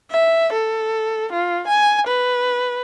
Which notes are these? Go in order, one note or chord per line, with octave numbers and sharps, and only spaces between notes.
E5
A4
F4
G#5
B4